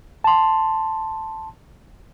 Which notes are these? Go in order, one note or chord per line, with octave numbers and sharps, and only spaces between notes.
A5 C6